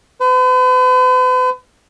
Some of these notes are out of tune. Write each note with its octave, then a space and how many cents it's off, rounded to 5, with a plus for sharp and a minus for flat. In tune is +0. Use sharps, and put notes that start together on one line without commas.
B4 +45